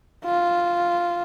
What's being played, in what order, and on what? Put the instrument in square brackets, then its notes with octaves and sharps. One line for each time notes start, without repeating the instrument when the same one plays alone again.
[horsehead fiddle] F4